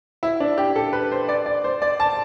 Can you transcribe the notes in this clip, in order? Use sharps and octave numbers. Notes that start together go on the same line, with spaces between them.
E4
D4
G4
A4
B4
C5
D5
D5
C5
D5
A5